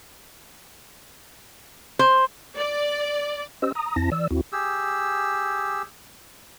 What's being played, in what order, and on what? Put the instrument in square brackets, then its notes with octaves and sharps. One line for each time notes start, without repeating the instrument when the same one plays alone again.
[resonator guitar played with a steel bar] C5
[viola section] D5
[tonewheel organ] C#4 G4 C5 D#5 E6
A#5 D#6
F2 C4 E4 A5 A#6
E3 D5 E6
D#2 C4 E4 F#4
[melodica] G4 G#4 E6